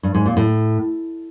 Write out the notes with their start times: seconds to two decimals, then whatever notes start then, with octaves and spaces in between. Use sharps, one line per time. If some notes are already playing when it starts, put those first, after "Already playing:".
0.03 G2
0.15 G#2
0.26 A#2
0.37 A2